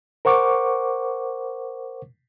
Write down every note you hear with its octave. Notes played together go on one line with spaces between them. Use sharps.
A#4 C5 F#5 C#6 D6